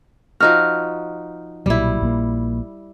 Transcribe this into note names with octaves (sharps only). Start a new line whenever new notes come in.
F3 D#4 F#4 F6
B1 A#2 F#3 G3 E4
A#1 A#2 A#3